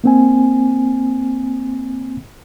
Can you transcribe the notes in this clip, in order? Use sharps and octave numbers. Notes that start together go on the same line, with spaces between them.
A#3 C4 G#5